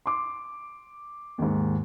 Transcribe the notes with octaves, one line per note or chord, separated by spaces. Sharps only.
C6 D6
D#2 G#2